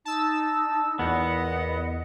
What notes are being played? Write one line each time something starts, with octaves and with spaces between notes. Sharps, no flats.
D#4 A5 E6
E2 A#2 B3 D#5 F#5